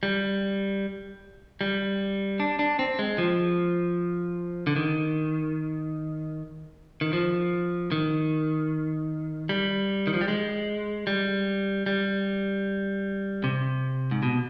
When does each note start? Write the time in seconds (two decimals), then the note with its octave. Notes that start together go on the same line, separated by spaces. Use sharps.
0.03 G3
1.61 G3
2.40 D4
2.59 D4
2.79 C4
2.99 G#3
3.18 F3
4.67 D3
4.76 D#3
7.01 D#3
7.13 F3
7.92 D#3
9.49 G3
10.07 D#3
10.14 F3
10.21 G3
10.28 G#3
11.07 G3
11.86 G3
13.44 C3
14.11 G#2
14.23 B2